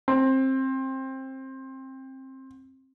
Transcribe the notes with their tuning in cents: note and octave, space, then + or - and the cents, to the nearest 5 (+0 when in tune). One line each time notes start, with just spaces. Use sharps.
C4 +20